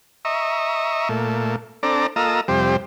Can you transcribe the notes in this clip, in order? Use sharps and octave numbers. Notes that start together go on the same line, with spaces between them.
D#5 E5 A#5 C#6
A#2 A3
C4 D4 A4 D5 A#5
A#3 F4 A4 D#5 A#5 E6
F2 C3 G3 G4 C5